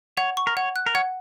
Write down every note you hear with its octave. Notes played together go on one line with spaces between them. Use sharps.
C#5 F#5
C#6
A#4
C#5 F#5
F#6
A#4
C#5 F#5